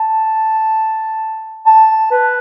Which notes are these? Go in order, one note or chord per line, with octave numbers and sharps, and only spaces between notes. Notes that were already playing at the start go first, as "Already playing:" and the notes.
Already playing: A5
A5
B4